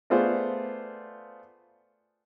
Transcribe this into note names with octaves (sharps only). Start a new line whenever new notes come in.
A3 B3 F4 G#4 C5 D5